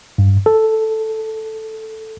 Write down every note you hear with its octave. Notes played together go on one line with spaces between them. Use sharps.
G2
A4